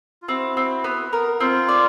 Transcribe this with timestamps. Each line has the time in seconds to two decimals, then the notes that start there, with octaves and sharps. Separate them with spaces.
0.22 F4
0.28 C4 E4 F#4
0.57 C4
0.84 B3
1.13 A#4
1.40 C4 F4
1.69 D5